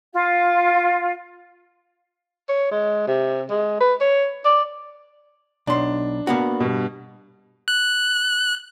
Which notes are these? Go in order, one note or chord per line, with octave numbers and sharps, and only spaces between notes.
F4
C#5
G#3
C3
G#3
B4
C#5
D5
B1 D4 C6
A#3 B3 F#4
G2 B2
F#6